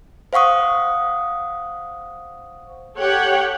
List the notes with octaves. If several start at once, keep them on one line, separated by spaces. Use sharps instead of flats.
C5 F5 F#5 C#6 D#6
G4 A4 C#5 F#5 G5